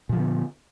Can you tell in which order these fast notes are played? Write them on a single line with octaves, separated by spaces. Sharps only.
A#2 F3 D3 B3